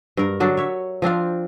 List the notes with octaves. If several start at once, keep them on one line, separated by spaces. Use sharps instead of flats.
G2 A#4
D3 F#3 D4
C#5 E5
F3 C4 D4 F5